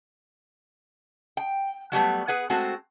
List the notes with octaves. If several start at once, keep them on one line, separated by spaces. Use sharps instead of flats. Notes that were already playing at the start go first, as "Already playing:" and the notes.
G5
F#3 G3 A3 B3
G#4 B4 F#5
G#3 A3 C4 F#4